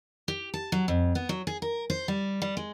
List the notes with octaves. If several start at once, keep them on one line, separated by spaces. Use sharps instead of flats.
G4
A5
F#3
F2
B3
F#3
G#4
A#4
C5
G3
G3
G#3